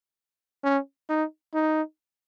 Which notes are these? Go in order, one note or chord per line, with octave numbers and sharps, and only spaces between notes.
C#4
D#4
D#4